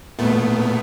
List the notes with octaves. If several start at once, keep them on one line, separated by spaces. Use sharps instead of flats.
A#2 A3 B3